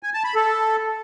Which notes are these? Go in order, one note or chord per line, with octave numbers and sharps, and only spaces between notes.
G#5
A5
B5
A4